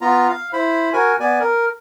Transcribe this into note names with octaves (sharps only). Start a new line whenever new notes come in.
B3 F4 A#5
F5
E4 C5 B5
F#4 A#4 G#5
B3 D5 G#5
A#4